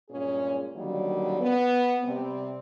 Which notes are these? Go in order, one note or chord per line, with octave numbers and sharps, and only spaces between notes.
G2 A#2 G#3 C#4 G#4
D3 D#3 F#3 G3 A#3 C#4
B3
C3 G3 C4